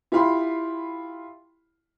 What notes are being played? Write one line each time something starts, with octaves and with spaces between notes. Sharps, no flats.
E4 F4 G4 F5 B5 C6